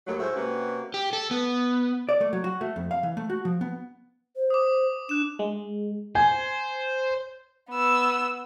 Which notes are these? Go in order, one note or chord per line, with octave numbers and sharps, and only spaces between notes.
D#2 F#3 A3
A2 G#3 E4 F#4 C5
C3 A#3 C#4 F#4 G4 B4
G4
A4
B3
D5
A3
F#3
F#4
A3
F2
F5
E3
A3
F#4
F3
B3
C5
D6 D#6
D4 F#6 E7
G#3
C5 G#5
B3 E6